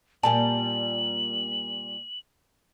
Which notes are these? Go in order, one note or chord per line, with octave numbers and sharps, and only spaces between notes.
A#2 G3 A#3 G#5 A5 F#7